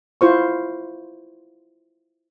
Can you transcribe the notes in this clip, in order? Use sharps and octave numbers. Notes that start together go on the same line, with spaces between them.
E4 F4 C5 C#6